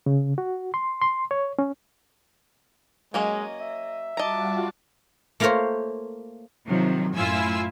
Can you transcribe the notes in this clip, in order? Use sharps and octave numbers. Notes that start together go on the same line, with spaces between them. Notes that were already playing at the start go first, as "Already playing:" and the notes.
C#3
F#4
C6
C6
C#5
C#4
F#3 G#3 A#3 C#4 D#5
E5
G3 F4 F#4 D#5 A5 A#5 D6
A3 A#3 F4 A#4 C5 C#5
C3 D#3 F3 F#3
F#2 A2 E4 F4 G#5 E6